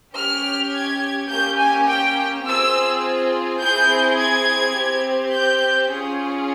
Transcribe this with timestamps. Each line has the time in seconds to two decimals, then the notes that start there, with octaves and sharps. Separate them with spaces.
0.14 C#4 G4 F6
0.72 G#6
1.29 A#3 C#4 G4 G6
1.58 G#5
1.86 G5
2.44 C4 F4 G#4 E6
3.59 C4 E4 G#4 G6
4.17 G#6
4.75 C4 G4
5.32 G6
5.89 C#4 F4 G#4